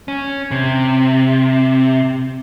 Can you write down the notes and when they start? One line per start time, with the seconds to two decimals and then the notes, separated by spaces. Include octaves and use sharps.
0.08 C#4
0.51 C3